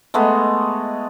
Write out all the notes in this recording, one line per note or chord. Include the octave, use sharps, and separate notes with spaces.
G#3 A3 B3 D#5